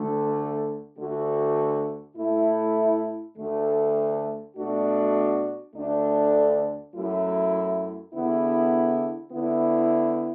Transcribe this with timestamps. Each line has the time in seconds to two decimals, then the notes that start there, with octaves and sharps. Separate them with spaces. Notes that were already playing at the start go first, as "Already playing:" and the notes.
Already playing: D2 D3 A3
0.98 D2 D3 A3 F#4
2.17 A2 A3 E4
3.36 D2 D3 A3
4.56 B2 A3 D4 F#4
5.75 D2 D3 A3 D4
6.94 F#2 F#3 A3 E4
8.14 E2 D3 B3 E4
9.32 D3 B3 E4